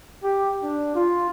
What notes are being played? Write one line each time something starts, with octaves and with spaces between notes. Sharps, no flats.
G4
D4
F4